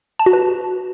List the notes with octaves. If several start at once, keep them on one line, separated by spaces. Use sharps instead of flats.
A5
F#4
B4